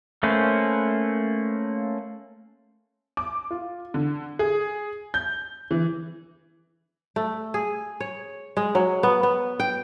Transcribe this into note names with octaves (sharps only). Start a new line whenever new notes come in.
A3 A#3 C#4 B4 C5
D6
F4
D3
G#4
G6
E3
A3
G#4
C#5
G#3
F#3
B3
B3
G5